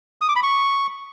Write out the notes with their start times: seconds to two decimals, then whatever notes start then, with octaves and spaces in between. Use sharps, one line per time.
0.21 D#6
0.29 D6
0.36 B5
0.43 C#6